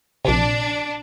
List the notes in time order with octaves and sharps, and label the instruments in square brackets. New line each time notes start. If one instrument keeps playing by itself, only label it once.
[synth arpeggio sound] A#1 C3 [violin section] D4